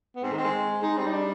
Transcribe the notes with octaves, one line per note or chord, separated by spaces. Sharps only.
B3
G#2 C4
D#3
C4
G#3
G#3 D#4
G3 C4
D#4
D4